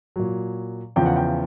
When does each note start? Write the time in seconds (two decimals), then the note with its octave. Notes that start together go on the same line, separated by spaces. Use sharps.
0.16 A#2 F#3
0.96 E2 C#3 F3 G5
1.06 F#5
1.16 G5